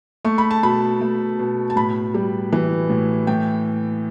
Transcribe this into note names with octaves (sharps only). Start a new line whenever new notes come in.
A3 C#6
B5
A5
B2 B5
A3
B2
A5
A2 B5
G3
E3
A2
A2 G5